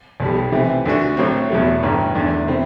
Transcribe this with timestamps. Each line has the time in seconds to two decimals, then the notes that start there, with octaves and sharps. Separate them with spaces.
0.20 B1 B2 G3
0.52 C3 E3 A3 C4
0.85 D2 D3 A3 D4 F#4
1.17 A1 A2 F#3 A3 C4
1.50 E2 B2 F#3 A3
1.83 A1 G2 D3
2.15 E2 D3 A3 D4
2.47 B2 A3 C4 E4